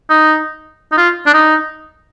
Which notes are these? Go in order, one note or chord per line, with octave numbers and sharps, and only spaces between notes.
D#4
D#4
F4
D4
D#4